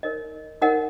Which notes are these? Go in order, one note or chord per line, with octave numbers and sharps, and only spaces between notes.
D#4 A#4 C#5 D#5
D#4 A#4 C#5 D#5 F#5